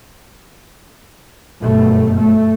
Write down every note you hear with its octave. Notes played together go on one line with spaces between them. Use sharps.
G1 F#2 B2 A3
A3